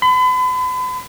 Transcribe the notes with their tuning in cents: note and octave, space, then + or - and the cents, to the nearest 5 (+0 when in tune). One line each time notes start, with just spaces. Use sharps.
B5 +40